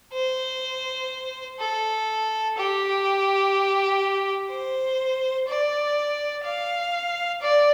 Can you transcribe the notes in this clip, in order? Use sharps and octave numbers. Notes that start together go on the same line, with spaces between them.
C5
A4
G4
C5
D5
F5
D5